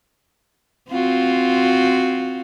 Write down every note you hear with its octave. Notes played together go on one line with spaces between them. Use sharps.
C4 F4 F#4